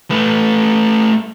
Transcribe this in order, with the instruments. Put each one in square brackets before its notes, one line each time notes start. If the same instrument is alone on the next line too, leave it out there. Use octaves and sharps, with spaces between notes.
[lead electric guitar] A3 B4